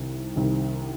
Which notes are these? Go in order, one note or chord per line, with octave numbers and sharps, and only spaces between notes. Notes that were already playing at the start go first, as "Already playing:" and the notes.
Already playing: C2 C3 D#3
C2 C3 D#3